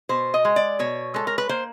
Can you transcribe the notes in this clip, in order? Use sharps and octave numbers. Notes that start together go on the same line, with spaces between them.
B2 C5
D#5
G#3
D5
B2 C#5
G#3 A4
A#4
B4
A#3 C5